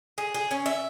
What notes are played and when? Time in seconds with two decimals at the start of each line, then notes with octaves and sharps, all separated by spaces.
0.18 G#4
0.35 G#4
0.51 C#4
0.66 E5